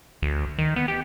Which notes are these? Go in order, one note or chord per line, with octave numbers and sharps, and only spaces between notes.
D2
D#3
B3
G4